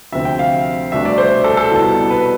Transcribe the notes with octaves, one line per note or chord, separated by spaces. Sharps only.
D2 C3 F3 C4 E5
G5
F5
C2 B2 A3 D4 E5
D5
C5
A4
A4
C2 B2 B3 E4
B4